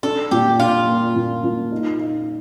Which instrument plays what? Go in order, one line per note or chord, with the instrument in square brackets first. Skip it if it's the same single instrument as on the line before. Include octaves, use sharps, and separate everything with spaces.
[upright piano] D4 [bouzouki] A4
[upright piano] A#2 [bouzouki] G4
[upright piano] D4 [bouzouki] F4
[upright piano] A#3
A#2
A#2
D#4
D#4